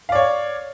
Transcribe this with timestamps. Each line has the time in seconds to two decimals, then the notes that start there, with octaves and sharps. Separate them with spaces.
0.09 F5
0.12 D5
0.15 C#5